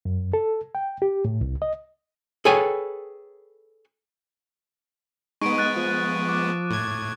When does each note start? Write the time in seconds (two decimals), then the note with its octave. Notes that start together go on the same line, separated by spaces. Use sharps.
0.05 F#2
0.34 A4
0.75 G5
1.02 G4
1.25 A2
1.41 C2
1.62 D#5
2.45 G#4 A4 B4 C#5 G5 G#5
5.41 G#3 B3 D#4 C#6 D7 D#7
5.57 D#6 F#6 A6
5.76 F3
6.29 D6
6.71 A2 G#6